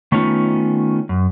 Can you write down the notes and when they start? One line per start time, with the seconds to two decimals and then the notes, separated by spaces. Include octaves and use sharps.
0.12 D#3 A3 B3 C#4 D#4 F4
1.09 F#2